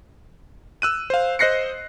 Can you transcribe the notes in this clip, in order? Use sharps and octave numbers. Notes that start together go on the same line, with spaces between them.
E6 F#6 D#7
C5 F5
C5 D#5 F#6 A#6 C7 C#7